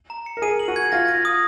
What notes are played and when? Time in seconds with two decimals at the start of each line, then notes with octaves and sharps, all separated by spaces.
0.10 A#5
0.26 C#7
0.37 A#4
0.42 G#4 D#7
0.59 F#7
0.68 F#4
0.76 G#6
0.92 F4 A#6
1.08 A#6
1.25 D#6